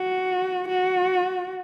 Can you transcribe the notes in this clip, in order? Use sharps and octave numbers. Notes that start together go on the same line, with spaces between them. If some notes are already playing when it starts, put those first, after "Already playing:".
Already playing: F#4
F#4